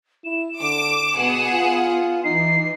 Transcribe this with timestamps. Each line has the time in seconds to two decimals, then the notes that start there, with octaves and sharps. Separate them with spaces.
0.24 E4 E7
0.61 D3 D6
1.16 B2 B3 G#4 F#5
1.52 F4
2.24 E3 D#4 C7